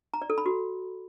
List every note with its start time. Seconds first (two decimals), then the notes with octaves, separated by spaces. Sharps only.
0.14 A#5
0.22 D5
0.30 A4
0.38 B5
0.46 F#4